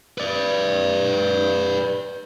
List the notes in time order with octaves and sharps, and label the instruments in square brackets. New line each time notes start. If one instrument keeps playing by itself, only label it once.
[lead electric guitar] B4 D5